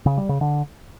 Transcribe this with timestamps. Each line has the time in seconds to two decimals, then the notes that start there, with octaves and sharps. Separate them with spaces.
0.06 C#3
0.17 G3
0.29 C#3
0.41 D3